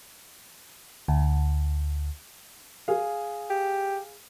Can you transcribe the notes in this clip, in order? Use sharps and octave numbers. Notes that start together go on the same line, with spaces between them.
D2
G#4 F5
G4